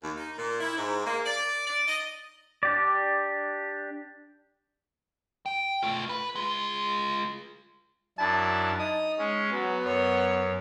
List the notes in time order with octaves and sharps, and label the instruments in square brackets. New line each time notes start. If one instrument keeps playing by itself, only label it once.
[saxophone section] D#2
D#4
A#2
E4
G#2
A#3
D5
D5
D#5
[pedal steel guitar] D4 G4 D5
[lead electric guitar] G5
A3 F4
B4
G#3 F4
[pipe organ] F#2 D4 E4 [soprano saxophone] A5
[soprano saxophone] D#4 [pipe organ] D#6
[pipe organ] G#3 C#4
[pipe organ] F#3 [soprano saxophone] B3
[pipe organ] F#2 [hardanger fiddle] C#5